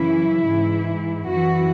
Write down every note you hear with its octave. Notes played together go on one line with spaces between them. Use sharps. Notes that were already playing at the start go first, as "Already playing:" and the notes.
Already playing: F#2 C#3 E3 E4
G#2 E3
F#2 E3 F#4